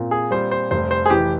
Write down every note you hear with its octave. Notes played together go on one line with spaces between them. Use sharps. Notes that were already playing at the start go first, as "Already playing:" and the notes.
Already playing: A#2 C4
G#4
G3 C5
C5
F1 C5
C5
G#4
E3 G4